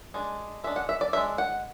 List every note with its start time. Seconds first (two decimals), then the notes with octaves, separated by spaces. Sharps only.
0.14 G#3 D4
0.64 G#3 E5
0.67 D4
0.76 F#5
0.89 E5
1.01 D5
1.13 G#3 D4 E5
1.38 F#5